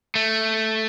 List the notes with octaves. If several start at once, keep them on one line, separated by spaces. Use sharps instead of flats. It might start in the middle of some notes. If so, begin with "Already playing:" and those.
A3